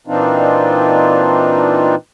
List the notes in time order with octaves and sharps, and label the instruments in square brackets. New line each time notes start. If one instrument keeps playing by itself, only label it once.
[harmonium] A#2 E3 C4 D4 D#4 F4